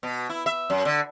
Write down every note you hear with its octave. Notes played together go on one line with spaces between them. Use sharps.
B2
E4
E5
F#2
D3